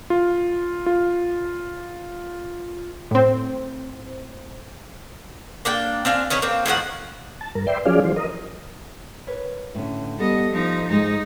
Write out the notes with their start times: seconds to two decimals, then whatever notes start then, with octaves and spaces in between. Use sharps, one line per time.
0.10 F4
0.86 F4
3.11 A2 C4
5.65 A#3 D4 G5
6.05 C4 D4 F5 G#5
6.30 D#3 C#4 B4 C#5
6.42 A#3 C4
6.66 A2 D#3 F3 F#5
7.41 A5
7.55 G2 A#4
7.67 B4 D5 E5 G5 C6
7.86 F3 F#3 C#4 G#4 D5 F5
8.04 E3 F#3 C5
8.16 A#4 D#5
9.27 A#4 B4 C#5
9.75 A2 D3 C#4
10.18 G3 B3 A4 D#5
10.51 F3 D#4
10.89 G#2 G#3 D#4